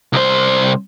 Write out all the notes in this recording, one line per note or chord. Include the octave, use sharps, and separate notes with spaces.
C2 C5